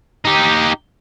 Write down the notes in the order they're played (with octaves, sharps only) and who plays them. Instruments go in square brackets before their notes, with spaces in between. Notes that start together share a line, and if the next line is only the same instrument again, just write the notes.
[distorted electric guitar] D#4 G4